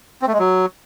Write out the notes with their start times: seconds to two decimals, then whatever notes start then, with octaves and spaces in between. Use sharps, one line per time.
0.22 C4
0.27 A3
0.33 G#3
0.39 F#3